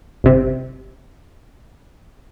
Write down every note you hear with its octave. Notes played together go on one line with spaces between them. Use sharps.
G1 C3